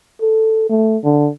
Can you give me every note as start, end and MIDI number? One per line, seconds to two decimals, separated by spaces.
0.21 0.66 69
0.69 0.97 57
1.04 1.29 50